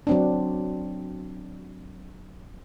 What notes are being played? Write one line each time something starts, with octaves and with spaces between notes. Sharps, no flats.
F#3 C4 D4